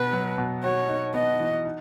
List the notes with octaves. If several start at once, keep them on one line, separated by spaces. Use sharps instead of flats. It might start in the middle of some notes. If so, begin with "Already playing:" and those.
Already playing: B2 B3 B4
F#3
B2
F#4 C#5
D#4
B3 D#5
E3
D#4